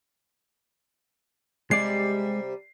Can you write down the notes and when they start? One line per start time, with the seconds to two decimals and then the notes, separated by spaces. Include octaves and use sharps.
1.71 C3 G3 G#3 G4 D5 C7